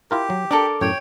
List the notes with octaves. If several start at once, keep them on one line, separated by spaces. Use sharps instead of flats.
E4 F4 G4 A#4
F#3
D4 A4 A#4 D5
F#2 A2 C#5 G5